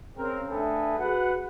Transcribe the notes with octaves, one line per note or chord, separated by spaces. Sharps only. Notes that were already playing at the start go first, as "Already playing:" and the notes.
C#3 C4 A#4
A3 D4 G#4 A4 B4 G5
F#4 G#4 B4 F#5